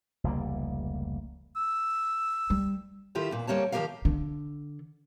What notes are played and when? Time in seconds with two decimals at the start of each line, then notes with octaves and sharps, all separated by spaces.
0.24 F1 C#2 G3 A#3
1.56 E6
2.50 G3
3.15 D#3 E4 F4 G4 A4
3.31 E2 A#2
3.47 D2 G3 A#3 C#5 A5
3.72 D#3 F3 F#3 G4 A#4 F5
4.05 D3